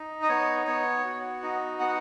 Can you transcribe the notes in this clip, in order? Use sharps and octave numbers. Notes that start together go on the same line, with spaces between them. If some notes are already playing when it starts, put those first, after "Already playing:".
Already playing: D#4
D#5
B3 C#5
B3 C#5
F#4
D#4
B3 F#5